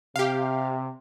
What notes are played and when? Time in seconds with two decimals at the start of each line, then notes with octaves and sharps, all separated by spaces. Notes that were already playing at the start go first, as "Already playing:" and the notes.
0.16 C3 G4 F5